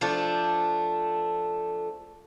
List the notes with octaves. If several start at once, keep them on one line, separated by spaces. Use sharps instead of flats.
F3 A3 D4